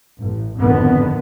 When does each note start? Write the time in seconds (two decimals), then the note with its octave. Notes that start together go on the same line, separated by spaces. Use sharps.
0.19 A1
0.57 G#1 F2 A2 D3 D#3 B3